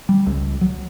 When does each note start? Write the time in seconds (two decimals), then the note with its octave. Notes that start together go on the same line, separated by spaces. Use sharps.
0.09 G3
0.27 C#2
0.61 F#3